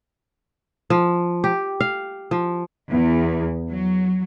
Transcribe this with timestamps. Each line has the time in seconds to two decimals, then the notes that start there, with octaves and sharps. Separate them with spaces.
0.90 F3
1.44 G4
1.80 F5
2.31 F3
2.91 E2
3.69 F#3